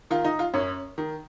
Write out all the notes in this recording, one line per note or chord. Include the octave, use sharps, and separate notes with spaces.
D#3 F4
D#4
F4
F#2 C#4
D#3